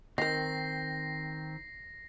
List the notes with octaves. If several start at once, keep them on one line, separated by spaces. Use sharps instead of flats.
D#3 C4 D#4 A#4 A#6 C7